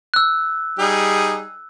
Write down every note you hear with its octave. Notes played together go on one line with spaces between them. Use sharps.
E6 F#6
G3 D#4 G#4